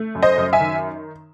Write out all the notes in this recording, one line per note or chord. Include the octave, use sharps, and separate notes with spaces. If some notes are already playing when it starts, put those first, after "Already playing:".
Already playing: A3
F#2
C5 D#5
F#2
E5 G#5
D#3